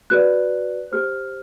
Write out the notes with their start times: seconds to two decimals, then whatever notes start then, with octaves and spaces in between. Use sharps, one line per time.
0.10 F#4 B4 D5 F#6
0.92 G4 C5 F6